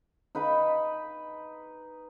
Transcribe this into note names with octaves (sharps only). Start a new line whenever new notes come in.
D#4 B4 G5 B5